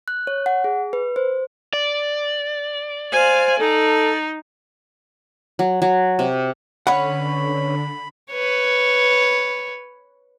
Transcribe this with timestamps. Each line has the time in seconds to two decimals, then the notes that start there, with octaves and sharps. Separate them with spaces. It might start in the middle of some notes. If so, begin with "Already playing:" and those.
0.08 F#6
0.27 C#5
0.46 F#5
0.64 G#4
0.93 B4
1.16 C5
1.73 D5
3.12 C5 F5 G#5
3.59 D#4 A4
5.59 F#3
5.82 F#3
6.19 C3
6.87 D3 C#4 B4 C#5 F#5 B5
8.33 B4 C#5